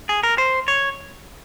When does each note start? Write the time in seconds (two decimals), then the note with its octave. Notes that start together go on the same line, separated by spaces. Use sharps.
0.09 G#4
0.23 A#4
0.38 C5
0.68 C#5